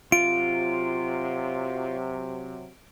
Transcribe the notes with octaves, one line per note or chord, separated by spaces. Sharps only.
C3 F#3 F4 D7